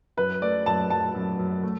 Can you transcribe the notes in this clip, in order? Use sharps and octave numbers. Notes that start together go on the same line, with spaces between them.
F#2 B4
A3 D5
F#2 A5
F#2 A5
F#2
F#2
A3